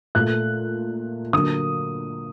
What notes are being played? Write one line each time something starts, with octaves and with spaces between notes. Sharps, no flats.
A#2 A3 F#6
D3 F#3 A#3 D#6